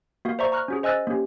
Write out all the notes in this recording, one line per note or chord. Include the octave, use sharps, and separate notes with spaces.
A#3 F#4 F5
C5 D5 E5 A#5 C#6
A#5 C#6 F6 F#6
C#4 F#4 G#4
C5 D#5 G#5 E6 F#6 A6
A#3 C#4 G4